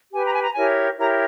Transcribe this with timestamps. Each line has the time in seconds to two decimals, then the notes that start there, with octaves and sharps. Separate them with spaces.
0.13 G4 B4 G#5
0.23 A#5
0.32 G#5
0.42 A#5
0.52 E4 G4 A#4 C#5 G#5
0.97 E4 G4 A#4 C#5 A#5